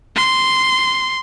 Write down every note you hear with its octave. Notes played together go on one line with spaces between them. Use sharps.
C6